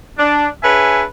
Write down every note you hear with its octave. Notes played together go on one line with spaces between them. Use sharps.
D4
D4 G#4 B4 C#5 E5 G#5